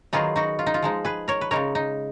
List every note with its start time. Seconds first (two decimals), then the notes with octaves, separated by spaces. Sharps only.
0.13 D#3 F#3 B3 D#4 F4 G#4
0.36 D#4 F#4
0.59 F4
0.66 D#4
0.74 F4
0.82 F3 G#3 D#4
1.05 G#4 B4
1.28 A#4 C#5
1.41 B4
1.51 C#3 G#3 D#4 A#4 C#5
1.75 D#4